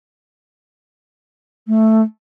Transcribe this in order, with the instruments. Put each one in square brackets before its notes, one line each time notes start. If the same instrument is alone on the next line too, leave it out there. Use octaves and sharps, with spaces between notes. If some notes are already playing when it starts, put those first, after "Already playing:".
[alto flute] A3